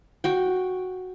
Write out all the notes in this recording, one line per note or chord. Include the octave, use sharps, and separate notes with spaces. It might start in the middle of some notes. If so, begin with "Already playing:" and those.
F#4 G5